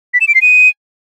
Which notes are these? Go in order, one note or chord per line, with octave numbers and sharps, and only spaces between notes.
B6
E7
D7
C7
D#7